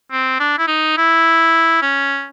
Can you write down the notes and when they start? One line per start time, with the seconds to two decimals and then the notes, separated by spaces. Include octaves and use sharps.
0.11 C4
0.40 D4
0.58 E4
0.67 D#4
0.97 E4
1.82 C#4